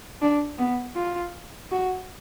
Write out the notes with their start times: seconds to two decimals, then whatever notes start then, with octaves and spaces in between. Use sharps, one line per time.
0.21 D4
0.58 B3
0.96 F4
1.71 F#4